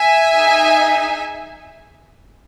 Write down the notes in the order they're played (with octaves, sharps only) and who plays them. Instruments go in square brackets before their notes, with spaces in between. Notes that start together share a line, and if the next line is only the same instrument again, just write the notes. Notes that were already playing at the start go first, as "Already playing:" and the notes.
Already playing: [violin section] E5 G#5
D#4 G#4